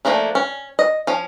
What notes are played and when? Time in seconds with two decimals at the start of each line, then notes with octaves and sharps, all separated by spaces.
0.05 F3 A3 A#3 D4 E4
0.35 C#4
0.79 D#5
1.07 F3 C#4